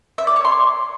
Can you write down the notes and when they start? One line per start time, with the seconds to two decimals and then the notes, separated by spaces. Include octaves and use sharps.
0.18 E5
0.27 D5
0.36 C#5
0.45 C6